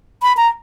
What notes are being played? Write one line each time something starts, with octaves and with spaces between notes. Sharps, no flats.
B5
A#5